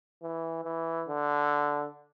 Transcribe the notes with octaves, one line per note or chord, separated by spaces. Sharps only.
E3
E3
D3